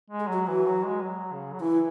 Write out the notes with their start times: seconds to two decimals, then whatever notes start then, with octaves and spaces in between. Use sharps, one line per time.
0.10 G#3
0.20 G#4
0.28 F#3 F#4
0.48 E3 F#4
0.67 F#3
0.85 G#3
1.04 F#3
1.32 C#3
1.53 F#3
1.61 E3 E4